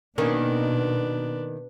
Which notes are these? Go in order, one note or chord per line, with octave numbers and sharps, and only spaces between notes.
B2 D#3 A#3 C#4 D4 B4